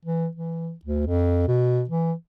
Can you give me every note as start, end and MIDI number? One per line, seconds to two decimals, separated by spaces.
0.05 0.28 52
0.35 0.72 52
0.85 1.04 38
1.06 1.44 41
1.48 1.84 47
1.89 2.13 52